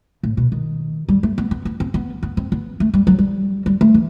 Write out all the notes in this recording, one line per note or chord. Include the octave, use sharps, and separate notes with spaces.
A2
B2
D#3
G3
A3
B3
B3
B3
C4
B3
B3
C4
B3
A3
G3
F#3
G3
G3
A3
E3